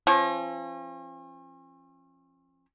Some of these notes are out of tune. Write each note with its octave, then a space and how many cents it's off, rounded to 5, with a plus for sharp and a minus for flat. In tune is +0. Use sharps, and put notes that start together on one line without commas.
F3 -30 C#4 -45